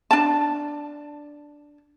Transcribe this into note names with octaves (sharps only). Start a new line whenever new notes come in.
D4 A5